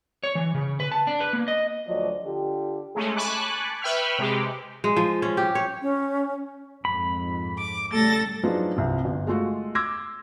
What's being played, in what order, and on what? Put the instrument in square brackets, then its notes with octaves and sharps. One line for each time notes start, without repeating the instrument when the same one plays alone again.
[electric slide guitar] C#5
E3
C#3
B4
A5
D4
B4
A#3
D#5
[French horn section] D2 F3 F#3 D5 D#5
D3 F4 G4
[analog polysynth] G#3 A3 C#4
G#5 A5 B5 C#6 D6 F#6
B4 E5 G5 B5 C#6 F6
C3 G#3 G4
[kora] G#3
F3
C#4
G4
C#5
[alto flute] C#4
[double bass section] F2 G#2 [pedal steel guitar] B5
[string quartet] D6
[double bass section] C#3 G3 A3 [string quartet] A4 A6 A#6
[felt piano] F3 F#3 D4 D#4 G#4 B4
C2 C3 F3
G1
G#3 A3 F4 F#4
C6 D6 E6 G#6 A#6